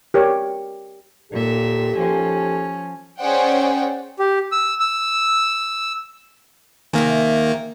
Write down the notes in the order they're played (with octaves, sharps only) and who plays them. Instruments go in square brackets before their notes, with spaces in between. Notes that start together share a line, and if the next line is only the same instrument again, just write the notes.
[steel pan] G4 A#4 C#5
[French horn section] D#2 G4 A4 [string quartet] A#2 E5
[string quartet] F3 C#4
[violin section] C#4 G#4 C5 D5 F#5 G5
[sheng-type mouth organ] G4
E6
E6
[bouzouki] C3 E5 G#5 [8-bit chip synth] D#3 A#3